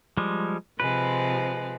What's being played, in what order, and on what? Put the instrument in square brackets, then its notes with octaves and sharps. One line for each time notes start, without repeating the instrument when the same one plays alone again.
[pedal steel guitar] F3 G3 G#3
[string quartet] C3 F3 G#3 [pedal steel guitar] B4